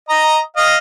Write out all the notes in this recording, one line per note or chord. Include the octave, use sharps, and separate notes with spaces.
D#5 A#5
D#5 F5